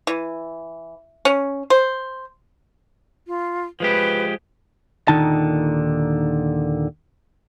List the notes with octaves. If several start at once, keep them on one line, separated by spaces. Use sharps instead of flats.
E3
C#4
C5
F4
F3 G#3 G4 B4
D#2 A#2 D3 D#3 D#4 A5